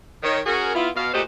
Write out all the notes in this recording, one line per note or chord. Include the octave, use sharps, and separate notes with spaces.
D#3 C#5
C#4 F#4 G#4 A#4
B3 E4 F4
B2 F5
A#2 A3 F#4 G4 C5 D#5